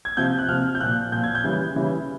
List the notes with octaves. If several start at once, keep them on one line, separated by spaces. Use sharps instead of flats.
G#6
C3 F3 G6
F#6
C3 F3 F6
G6
A#2 F3 F#6
A#2 F3 G6
G#6
G6
C#3 E3 G3
C#3 E3 G3